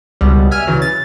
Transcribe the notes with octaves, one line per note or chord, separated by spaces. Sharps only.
C#2 B2 G3
E5 G#5 F6
C#3 E3 F#3
A6